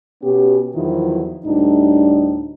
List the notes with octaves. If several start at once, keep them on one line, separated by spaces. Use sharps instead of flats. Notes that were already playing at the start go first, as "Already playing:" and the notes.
B2 B3 C#4 G4
E2 D#3 F3 F#3 E4
D2 A2 G3 D4 D#4